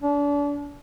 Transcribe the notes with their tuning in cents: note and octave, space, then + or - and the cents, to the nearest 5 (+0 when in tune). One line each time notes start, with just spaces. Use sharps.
D4 -35